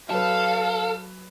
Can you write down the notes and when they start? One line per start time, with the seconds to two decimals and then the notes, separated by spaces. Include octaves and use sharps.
0.10 F#3 A4 B4 F5